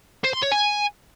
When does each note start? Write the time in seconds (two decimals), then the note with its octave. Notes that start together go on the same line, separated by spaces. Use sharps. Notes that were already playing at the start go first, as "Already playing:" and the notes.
0.24 C5
0.33 C6
0.42 C#5
0.52 G#5